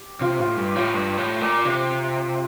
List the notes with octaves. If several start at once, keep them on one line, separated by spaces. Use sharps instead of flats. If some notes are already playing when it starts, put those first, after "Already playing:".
Already playing: G4
C3 F4
A2 F4
G2 G4
A2 F4
G2
A2
A#2
C3 F4